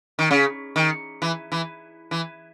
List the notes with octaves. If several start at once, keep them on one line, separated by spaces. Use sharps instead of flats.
D#3
C#3
D#3
E3
E3
E3